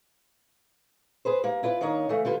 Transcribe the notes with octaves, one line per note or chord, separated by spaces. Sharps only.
G#4 B4 C5
G3 A#3
E4 F4 B4 D5
D#3 A#3 D4 C#5 D#5
C#3 E3 A3
D3 G3 F4 B4